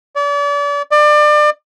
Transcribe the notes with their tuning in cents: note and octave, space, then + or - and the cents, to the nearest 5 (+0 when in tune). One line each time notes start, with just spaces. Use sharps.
D5 -40
D5 +30